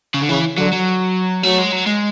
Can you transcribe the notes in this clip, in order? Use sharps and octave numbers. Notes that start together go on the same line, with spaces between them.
C#3
D3
C#3 E3
D3 F#3
F#3
F#3 A3
G#3
F#3
G#3